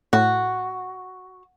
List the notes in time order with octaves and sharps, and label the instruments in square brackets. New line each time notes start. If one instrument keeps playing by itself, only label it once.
[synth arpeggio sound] A2 [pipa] F#4